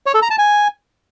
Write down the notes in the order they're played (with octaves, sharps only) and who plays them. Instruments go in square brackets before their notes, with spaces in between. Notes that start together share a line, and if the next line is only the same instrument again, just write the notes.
[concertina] C#5
A4
A#5
A5
G#5